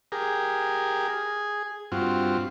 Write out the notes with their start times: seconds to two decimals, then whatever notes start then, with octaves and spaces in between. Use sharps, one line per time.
0.12 G4 G#4 A#4
1.08 G#4
1.92 G2 C4 F4 F#4